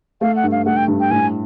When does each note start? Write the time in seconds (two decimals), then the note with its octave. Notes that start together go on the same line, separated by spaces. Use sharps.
0.21 A3 F5
0.36 F#5
0.43 G2
0.52 F5
0.66 A3 F#5
0.77 G5
0.88 G2
1.00 G5
1.11 A2 G#5